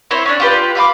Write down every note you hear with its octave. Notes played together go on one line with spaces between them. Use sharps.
C4 E4 C5 C#5
C#4 D4
F4 G4 B4
E5 F5 B5 D6